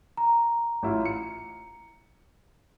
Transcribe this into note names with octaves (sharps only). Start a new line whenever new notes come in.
A#5
A1 E4 F4
C#7